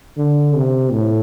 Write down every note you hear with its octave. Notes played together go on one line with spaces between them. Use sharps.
D3
C3
A2